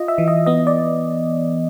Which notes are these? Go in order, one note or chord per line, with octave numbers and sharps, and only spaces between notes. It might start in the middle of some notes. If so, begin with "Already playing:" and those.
Already playing: F4 D#5
E5
E3
D#5
B3 D#5
D5